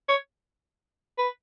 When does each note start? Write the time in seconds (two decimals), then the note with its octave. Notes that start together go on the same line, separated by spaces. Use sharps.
0.09 C#5
1.18 B4